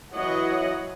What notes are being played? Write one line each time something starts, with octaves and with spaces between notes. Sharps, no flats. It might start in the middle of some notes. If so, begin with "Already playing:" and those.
E3 F#3 E4 C#5 D#5 F#5